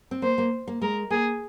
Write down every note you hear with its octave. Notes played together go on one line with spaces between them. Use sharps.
C4
A#3 C5
A#3
A#3
G#3 A#4
A#3 G#4